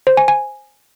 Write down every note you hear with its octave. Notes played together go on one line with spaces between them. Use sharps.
C5
G#5
G#5